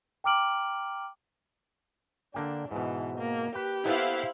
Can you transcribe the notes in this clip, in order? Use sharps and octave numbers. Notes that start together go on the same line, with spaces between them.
G5 A#5 D6 F6 D7 F#7
D3 A#3 D4 G5
G#2 B2 E3
A#3
G4 B4
B3 E4 A4 B4 C5 F5